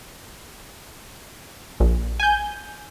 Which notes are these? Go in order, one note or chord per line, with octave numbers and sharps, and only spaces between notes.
A#1
G#5 G6